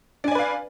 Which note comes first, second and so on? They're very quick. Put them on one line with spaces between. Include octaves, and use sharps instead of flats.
D4 G#5 D5 B4 F5